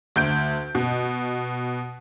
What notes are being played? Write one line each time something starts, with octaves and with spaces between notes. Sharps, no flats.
D2 G6 D7
B2